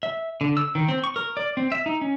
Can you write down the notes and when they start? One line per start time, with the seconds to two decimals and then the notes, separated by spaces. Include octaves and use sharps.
0.03 E5
0.41 D3
0.57 E6
0.75 D#3
0.89 C4
1.04 C#6
1.16 A#4
1.37 D5
1.57 C4
1.72 E5
1.86 D#4
2.01 C#4